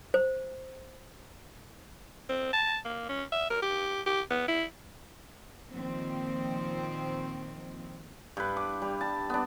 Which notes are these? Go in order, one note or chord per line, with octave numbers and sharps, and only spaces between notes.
C5
C4
A5
A#3
C#4
E5
A#4
G4
G4
B3
E4
A#2 D#3 F3 C4
G2 B4
D6
G3
A5
B3 D4